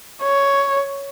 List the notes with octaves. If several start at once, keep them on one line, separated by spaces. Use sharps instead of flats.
C#5